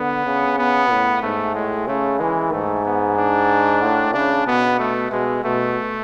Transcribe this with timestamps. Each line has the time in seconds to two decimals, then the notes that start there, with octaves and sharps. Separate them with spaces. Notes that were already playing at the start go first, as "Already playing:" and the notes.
Already playing: D3 B3
0.26 C#3
0.58 B3
0.91 A2
1.22 G#2 A3
1.55 A2 G#3
1.88 C#3 A3
2.19 E3 G#3
2.53 G#2 A3
2.85 B3
3.17 D4
3.82 A2
4.14 C#3 D4
4.47 B2 B3
4.79 A3
5.11 B2 G#3
5.44 B2 A3